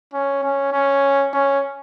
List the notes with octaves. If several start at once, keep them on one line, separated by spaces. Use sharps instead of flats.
C#4
C#4
C#4
C#4